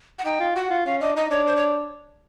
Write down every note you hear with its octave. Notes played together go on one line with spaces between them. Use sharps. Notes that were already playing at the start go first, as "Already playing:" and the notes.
F#5
D#4 G5
F4
F#4 F#5
F4
C#4 F5
D4 D#5
D#4 D#5
D4 C#5
C5
C#5